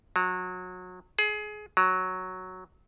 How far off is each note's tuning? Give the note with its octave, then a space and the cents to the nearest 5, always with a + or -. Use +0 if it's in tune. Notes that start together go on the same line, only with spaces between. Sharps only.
F#3 -25
G#4 +25
F#3 +0